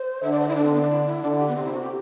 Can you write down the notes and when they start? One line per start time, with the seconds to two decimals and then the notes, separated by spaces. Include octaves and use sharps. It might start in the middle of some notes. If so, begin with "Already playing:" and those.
Already playing: C5
0.22 D3 E5
0.32 D5
0.39 C5
0.48 E4
0.56 D3 D4
0.64 C4
0.72 B3
0.81 D4
0.90 E4
1.06 E4
1.22 D3 D4
1.31 E4
1.39 G4
1.48 B3
1.56 C3 C4
1.64 E4
1.73 F#4
1.81 G4